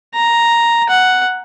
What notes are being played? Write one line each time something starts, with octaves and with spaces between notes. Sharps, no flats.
A#5
F#5